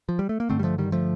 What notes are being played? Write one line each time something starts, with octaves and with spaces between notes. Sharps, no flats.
F3
G3
A3
A#3
G2 D3 A3 C4
G3
F3 A3
D#3 G3
F3 A3